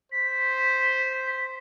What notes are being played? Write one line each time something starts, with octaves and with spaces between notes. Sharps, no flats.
C5 B6